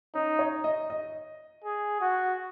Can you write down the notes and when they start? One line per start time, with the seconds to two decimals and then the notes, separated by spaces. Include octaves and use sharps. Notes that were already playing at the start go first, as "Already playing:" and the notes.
0.14 C#4 D#4
0.39 C#5
0.64 D#5
0.90 D#5
1.64 G#4
2.01 F#4